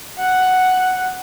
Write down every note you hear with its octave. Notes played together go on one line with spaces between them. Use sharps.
F#5